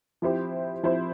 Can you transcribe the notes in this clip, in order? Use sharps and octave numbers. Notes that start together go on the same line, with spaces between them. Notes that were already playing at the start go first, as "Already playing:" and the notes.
F3 C4 E4 G4 C5
F3 C4 E4 G4 C5